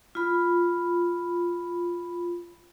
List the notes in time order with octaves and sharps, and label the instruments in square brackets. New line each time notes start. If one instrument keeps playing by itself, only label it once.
[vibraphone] F4 B5